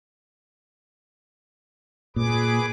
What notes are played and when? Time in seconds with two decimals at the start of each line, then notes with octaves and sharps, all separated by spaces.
2.16 A#2 G#4 B4 D6